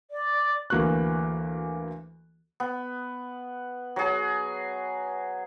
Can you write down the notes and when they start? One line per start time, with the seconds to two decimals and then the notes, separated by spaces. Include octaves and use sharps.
0.11 D5
0.70 D2 E3 A#3 F#4 C#6 F#6
2.60 B3
3.96 F#3 G#4